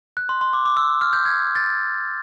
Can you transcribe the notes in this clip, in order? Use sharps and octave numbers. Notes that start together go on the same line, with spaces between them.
F#6
C6
C6
D6
D6
E6
F6
G6
G#6
A6